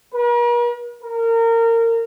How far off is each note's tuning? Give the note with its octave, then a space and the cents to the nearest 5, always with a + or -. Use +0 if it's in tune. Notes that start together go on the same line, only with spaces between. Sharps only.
A#4 +45
A#4 -25